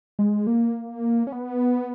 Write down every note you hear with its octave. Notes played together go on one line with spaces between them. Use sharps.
G#3
A#3
C#4
B3